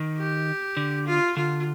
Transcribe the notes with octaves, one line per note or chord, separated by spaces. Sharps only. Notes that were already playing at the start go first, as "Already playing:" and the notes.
Already playing: D#3
G4
D3
F4
D3 F4